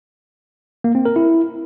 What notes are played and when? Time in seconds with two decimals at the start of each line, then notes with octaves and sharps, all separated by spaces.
0.84 A#3
0.95 C4
1.05 A#4
1.16 E4